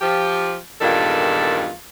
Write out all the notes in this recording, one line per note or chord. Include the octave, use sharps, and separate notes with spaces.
F3 G4
E2 G2 A#2 D#3 F4 A4